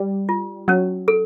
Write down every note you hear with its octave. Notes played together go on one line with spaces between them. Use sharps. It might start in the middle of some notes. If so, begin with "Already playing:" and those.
Already playing: G3
F4
F#3 C#4
A4